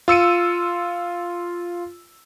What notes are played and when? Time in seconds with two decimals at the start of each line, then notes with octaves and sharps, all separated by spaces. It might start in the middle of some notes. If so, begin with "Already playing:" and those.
0.08 F4 E6 C#7 D#7